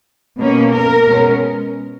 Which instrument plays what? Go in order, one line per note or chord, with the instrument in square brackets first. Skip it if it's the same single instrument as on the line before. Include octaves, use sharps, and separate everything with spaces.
[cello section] B2 A#3 C#4
A#4
B2 G#3 C#4